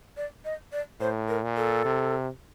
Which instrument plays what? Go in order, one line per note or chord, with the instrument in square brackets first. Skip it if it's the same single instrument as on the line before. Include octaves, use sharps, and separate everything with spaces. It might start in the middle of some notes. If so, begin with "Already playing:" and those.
[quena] D5
D#5
D5
[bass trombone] A2 [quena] C5
[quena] A#4
[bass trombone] A#2
[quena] A4
[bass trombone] C3